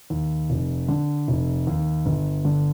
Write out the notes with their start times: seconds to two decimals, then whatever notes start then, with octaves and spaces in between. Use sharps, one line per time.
0.10 D#2
0.50 F1
0.88 D3
1.28 F1
1.67 D#2
2.06 G1
2.45 D3